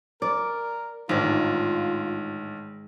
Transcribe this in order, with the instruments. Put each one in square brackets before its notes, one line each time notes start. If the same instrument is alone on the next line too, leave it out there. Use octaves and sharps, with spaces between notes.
[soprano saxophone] A#4 [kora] D5
[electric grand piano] A1 D4 [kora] G#2 D#3 [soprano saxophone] F4